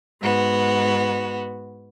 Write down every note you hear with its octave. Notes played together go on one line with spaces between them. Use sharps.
G#2 B3 F#4